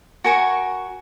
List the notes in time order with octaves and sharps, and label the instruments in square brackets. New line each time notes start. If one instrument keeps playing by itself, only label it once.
[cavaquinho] F#4 A#4 G#5 C#6